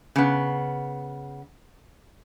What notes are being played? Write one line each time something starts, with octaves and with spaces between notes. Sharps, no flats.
C#3 B3